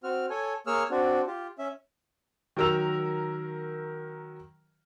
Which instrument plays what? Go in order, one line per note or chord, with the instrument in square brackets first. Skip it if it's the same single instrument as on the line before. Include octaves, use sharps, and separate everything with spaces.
[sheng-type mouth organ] C4 F#4 F6
A4 C#5 G#5
A#3 G#4 C#5 E6 F6
C4 D4 F#4
F4 G4
C#4 E5
[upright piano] D#3 F#3 A#4 E6 F7